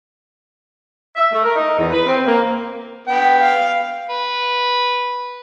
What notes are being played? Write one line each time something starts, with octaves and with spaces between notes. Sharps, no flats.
E5
A3
A#4
D#4
E2
B4
C4
A#3
B3 G5
F5
B4